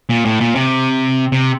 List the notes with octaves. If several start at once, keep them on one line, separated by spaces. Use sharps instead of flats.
A#2
A2
A#2
C3
C3